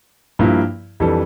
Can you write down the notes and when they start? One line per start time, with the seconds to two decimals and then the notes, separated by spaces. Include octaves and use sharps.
0.39 G2 F3 A#3 E4
1.00 F2 E3 G3 D4 A4